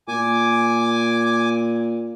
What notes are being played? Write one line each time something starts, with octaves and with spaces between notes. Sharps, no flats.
A#2 G#5 D6